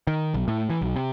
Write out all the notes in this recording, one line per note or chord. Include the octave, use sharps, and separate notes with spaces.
D#3
B1
A2
E3
B1
C3